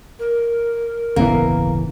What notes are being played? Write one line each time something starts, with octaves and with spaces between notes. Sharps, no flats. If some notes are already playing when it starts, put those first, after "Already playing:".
A#4
D1 G1 C#3 E3 A#3 B3